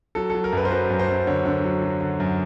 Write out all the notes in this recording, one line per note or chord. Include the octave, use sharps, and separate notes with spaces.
F#3 A4
F#3 A4
A#4
F#2 B4
C5
F#3 B4
F#2
C5
F#2
D3 C#5
D3
F#3
F#3
D3
F#2